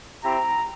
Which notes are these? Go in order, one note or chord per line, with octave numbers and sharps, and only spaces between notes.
C4 E4 G4 A#5